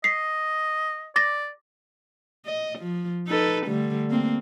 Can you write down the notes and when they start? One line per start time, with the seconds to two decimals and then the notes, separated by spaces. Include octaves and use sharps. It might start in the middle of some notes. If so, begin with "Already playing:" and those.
0.04 D#5 B6 C7
1.16 D5 D6 A6 A#6
2.46 D#5
2.79 F3
3.28 D#4 A4 B4
3.66 D3 G3 A3
4.10 A#3 C4